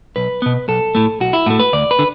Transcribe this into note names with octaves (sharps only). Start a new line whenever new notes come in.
B1 B4
B2 B3
B1 A4
A2 A3
B1 F#4
E4
A2 A3 F#4
B4
D2 D5
B4
D3